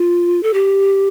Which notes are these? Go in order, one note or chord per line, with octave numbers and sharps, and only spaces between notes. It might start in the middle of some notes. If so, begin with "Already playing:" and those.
Already playing: F4
A4
G4